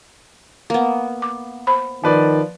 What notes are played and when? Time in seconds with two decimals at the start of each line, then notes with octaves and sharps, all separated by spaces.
0.70 A#3 B3
1.22 D6
1.67 C5 B5
2.04 D#3 F3 B4 D5